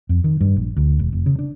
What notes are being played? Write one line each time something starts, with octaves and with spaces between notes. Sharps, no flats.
F2
D#3
G2
A#1
D2
E1
F1
C#3
D4